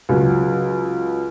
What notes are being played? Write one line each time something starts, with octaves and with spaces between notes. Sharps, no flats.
C#2 F#3